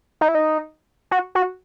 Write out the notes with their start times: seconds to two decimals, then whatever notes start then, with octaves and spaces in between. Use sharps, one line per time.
0.21 D#4
0.28 E4
0.35 D#4
1.11 F#4
1.35 F#4